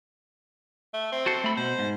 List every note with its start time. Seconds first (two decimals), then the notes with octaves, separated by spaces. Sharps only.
0.94 A3
1.12 C4
1.26 F#4 A4 C5
1.44 A3 B5
1.57 B2 C5
1.79 G#2